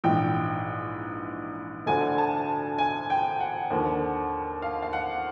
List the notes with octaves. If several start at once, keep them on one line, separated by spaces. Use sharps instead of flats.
A#1 G#2 E3 G5
D2 D3 F3 G#5
A5
G#5
G5
F#5
D#2 D3 F3
F5
F5
F#5